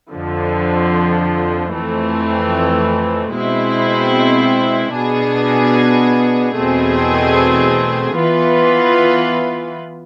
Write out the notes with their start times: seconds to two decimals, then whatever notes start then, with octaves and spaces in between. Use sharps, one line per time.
0.12 F2 D3 F3
1.72 F2 E3 A3 C4
3.32 B2 G#3 C4 E4
4.93 B2 B3 D4 G#4
6.55 E2 B2 A3 C4 G#4
8.16 E3 B3 F4 B4